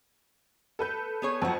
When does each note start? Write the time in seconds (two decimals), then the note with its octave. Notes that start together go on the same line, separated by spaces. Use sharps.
0.79 A4 B4 G6
1.22 B3 G#4 C#5
1.42 F2 F3 F#3 F#5